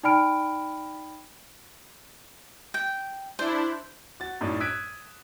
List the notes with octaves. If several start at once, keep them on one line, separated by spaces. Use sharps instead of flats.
D#4 D5 G5 B5 F6 D7
G5
D4 E4 C5
F#4 A6
F#2 A2 D4 D#4
D#6 E6 F#6 G#6 B6 D7